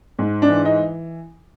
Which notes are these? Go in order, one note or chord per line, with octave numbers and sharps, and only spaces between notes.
G#2
D4
E3
D#4